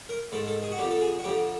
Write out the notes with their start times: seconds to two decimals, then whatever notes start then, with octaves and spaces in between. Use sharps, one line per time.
0.09 A#4
0.32 G#2 D#3 A4
0.47 A4
0.63 G#4
0.72 F#4
0.78 F2 D3 G4
0.90 A4
1.01 G#4
1.19 F#4
1.24 F2 D3 G4